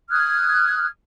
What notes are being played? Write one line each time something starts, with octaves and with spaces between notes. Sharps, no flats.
D#6 F6 F#6 G#6